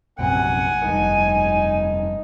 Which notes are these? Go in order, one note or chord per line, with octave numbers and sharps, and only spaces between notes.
A#1 F#2 C3 F#5 G#5
F1 G2 D#4